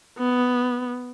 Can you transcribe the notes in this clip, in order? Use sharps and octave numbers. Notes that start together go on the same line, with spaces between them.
B3